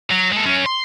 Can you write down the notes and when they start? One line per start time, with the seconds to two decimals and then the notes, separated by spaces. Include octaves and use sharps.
0.11 F#3
0.32 G#3 A4
0.45 F#2 C#4
0.66 C6